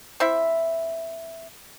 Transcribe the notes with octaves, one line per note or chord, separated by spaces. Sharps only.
C4 E4 E5